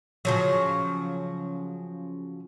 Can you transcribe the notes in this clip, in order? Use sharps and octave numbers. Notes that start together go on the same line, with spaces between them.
C#3 F3 F#3